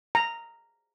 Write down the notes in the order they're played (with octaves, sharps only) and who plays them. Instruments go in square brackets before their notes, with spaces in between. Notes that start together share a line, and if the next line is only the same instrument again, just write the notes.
[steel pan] A#5